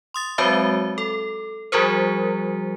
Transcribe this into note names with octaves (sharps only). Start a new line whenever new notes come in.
C6 D#6 A6
F#3 G#3 C4 F#4 C5 E5
A4
F3 G3 F#4 G#4 A#4 C5